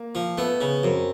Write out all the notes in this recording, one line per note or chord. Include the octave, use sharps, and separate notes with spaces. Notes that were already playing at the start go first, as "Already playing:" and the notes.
Already playing: A#3
F3
A3 B3
C#3
F#2 C4